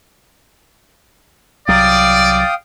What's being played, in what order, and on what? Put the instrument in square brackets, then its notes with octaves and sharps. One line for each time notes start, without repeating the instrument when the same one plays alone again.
[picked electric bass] C2 F#3 [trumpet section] D5 [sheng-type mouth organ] F5 G5 D#6